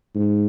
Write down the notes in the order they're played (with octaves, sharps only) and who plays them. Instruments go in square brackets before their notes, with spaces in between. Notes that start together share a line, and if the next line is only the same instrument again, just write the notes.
[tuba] G#2